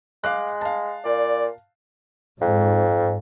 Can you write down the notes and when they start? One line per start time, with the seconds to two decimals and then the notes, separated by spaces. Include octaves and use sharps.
0.24 G#3 F5 D6 F#6
0.61 F5 A5
1.05 A#2 D5
2.41 F2 G#2